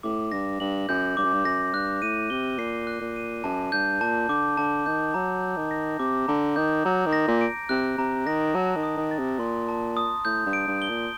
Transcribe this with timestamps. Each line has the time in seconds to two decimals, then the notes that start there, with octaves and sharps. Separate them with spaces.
0.03 A2 D6
0.32 G2 A#6
0.60 G2 F#7
0.88 F#2 G6
1.17 G2 D6
1.25 F#2
1.33 G2
1.45 F#2 A#6
1.74 G2 F#6
2.02 A2 D#7
2.30 C3 G7
2.59 A#2 C7
2.87 F#6
3.01 A#2
3.16 D#7
3.44 F#2 A5
3.72 G2 G6
4.00 A#2 A5
4.29 D3 D6
4.57 D3 A5
4.86 D#3 G6
5.14 F#3 A#5
5.42 G6
5.57 D#3
5.71 A#6
5.99 C3 D6
6.28 D3 A#5
6.56 D#3 G6
6.85 F#3 A#5
7.06 D#3
7.13 A#6
7.28 A#2
7.41 D7
7.69 C3 F#6
7.98 C3 A#5
8.26 D#3 A#6
8.55 F#3 A5
8.76 D#3
8.83 D#6
8.97 D#3
9.11 A6
9.19 C3
9.39 A#2 C6
9.68 A5
9.97 D#6
10.25 A2 G6
10.46 G2
10.53 D7
10.68 G2
10.82 G7
10.89 A#2